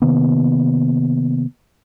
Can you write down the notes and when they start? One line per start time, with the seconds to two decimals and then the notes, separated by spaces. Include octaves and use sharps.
0.02 C3 D#3 A#3 B3